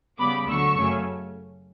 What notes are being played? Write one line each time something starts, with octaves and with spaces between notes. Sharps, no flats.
C#3 G3 B3 B5 D6
D2 D3 F#3 A3 C#6 E6
F#2 C#3 F#3 A3 C#4